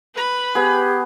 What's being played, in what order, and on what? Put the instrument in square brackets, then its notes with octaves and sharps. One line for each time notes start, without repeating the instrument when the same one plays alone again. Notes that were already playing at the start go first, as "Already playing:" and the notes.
[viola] B4 B5
[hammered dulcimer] B3 G#4 [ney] G4